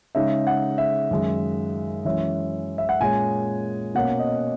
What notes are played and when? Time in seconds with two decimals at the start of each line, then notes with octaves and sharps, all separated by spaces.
0.15 C#3 G#3 D#4 E5
0.47 F#5
0.78 E5
1.11 F#2 D#3 G#3 D#4
2.05 F#2 E3 G#3 C#4 E5
2.78 E5
2.89 F#5
3.00 A#2 G#3 C#4 G#5
3.95 B2 A#3 C#4 F#5
4.19 D#5